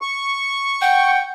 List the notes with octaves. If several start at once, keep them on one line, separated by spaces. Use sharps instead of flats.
C#6
F#5 G5